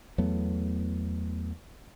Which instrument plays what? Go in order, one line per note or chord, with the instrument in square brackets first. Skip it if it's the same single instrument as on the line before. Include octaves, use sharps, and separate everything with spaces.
[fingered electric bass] E2 F#3 A3 B3